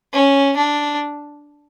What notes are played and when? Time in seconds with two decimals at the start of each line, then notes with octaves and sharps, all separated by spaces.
0.14 C#4
0.57 D4